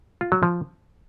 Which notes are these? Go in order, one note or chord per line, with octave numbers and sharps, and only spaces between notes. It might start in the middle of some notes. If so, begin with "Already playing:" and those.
F4
F#3
F3